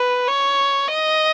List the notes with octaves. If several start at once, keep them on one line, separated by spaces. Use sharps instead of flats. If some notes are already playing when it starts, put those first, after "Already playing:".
Already playing: B4
C#5
D#5